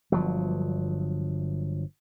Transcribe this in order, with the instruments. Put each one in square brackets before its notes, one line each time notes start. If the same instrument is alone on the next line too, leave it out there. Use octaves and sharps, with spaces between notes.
[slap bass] G1 F3 F#3